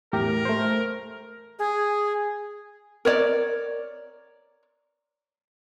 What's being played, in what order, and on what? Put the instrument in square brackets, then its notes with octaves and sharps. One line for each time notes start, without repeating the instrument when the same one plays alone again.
[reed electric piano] E2 A2 G4 [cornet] A#4
[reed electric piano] A3 C5
[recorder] G#4
[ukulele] A#4 C#5 D5